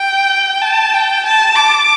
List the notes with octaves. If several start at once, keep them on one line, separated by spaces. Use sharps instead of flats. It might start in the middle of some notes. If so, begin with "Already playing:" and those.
Already playing: G5
A5
G5
A5
D6